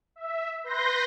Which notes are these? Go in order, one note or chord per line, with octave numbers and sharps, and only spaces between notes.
E5
B4 C6 G6 A#6